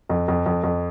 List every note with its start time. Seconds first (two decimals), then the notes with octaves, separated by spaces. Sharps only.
0.09 F2
0.28 F2
0.46 F2
0.63 F2